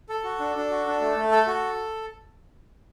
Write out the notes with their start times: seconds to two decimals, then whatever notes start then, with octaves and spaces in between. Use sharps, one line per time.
0.09 A4
0.24 F#4
0.39 D4
0.55 D4
0.70 F#4
0.86 D4
1.01 A3
1.17 A3
1.31 A4
1.47 F#4